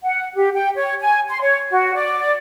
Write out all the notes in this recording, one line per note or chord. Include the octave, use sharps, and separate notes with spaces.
F#5
G4
G5
C#5
G#5
C6
C#5
F#4
D5